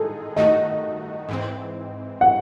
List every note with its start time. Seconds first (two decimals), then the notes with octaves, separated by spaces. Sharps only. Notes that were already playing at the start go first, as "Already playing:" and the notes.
Already playing: D#3 G#3 D#4 G#4 A4
0.36 D#3 A3 D#4 F#4 D#5
1.29 G#2 E3 C4
2.21 F#5